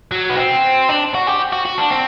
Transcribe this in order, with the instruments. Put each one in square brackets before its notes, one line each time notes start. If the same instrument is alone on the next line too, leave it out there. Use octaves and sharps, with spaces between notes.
[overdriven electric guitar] F#3
B3
C4
D4
F#4
G4
F#4
F#4
D4
C4